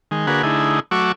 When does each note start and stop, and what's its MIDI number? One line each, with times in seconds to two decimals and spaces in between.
0.11 0.26 51
0.11 0.26 56
0.27 0.42 50
0.27 0.42 58
0.27 0.42 66
0.27 0.42 68
0.27 0.42 71
0.43 0.80 50
0.43 0.80 57
0.43 0.80 63
0.43 0.80 64
0.43 0.80 68
0.91 1.12 54
0.91 1.12 57
0.91 1.12 66
0.91 1.12 85
0.91 1.12 86
0.91 1.12 88